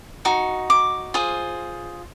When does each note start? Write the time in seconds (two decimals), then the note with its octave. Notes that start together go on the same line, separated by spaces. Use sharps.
0.25 D#4 F#4
0.70 D6
1.14 F4 G#4 C5